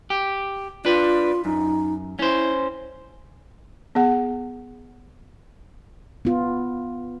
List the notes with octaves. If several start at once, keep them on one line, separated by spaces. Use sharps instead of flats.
G4
D4 F4 B4
F#2 D#4
C#4 E4 C5
B3 G#4 F#5
B3 F4